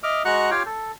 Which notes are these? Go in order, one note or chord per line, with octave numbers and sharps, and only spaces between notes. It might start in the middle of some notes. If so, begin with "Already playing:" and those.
D#5 E5 D6 F6
G#3 F#4 F#5 A#5 C#6 F#6
F4 G4 C#5 F5 G5
A4